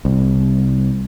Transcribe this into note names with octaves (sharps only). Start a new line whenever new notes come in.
C2